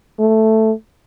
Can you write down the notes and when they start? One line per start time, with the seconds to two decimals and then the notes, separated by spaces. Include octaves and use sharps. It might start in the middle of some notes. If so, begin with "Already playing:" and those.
0.19 A3